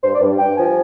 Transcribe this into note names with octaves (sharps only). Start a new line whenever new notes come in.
G2 C5
D5
G2
G2 G5
F3 G#5